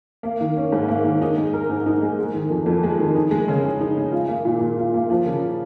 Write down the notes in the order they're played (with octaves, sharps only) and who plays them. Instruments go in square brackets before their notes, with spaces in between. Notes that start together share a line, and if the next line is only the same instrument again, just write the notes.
[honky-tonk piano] A#3
D#3
C#4
G#2
A#3
D#3
D#4
G#3
A#4
G#2
D#4
G#3
G#3
D#3
F2
F2
G#3
D#3
D#4
G#3
C#3
C#3
D#4
G#3
F4
A#3
A#2
A#2
F4
A#3
F3
C#3